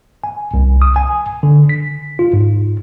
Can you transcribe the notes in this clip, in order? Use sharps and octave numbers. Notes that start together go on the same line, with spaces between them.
G#5
C2
D#6
G#5
D3
B6
F4
G#2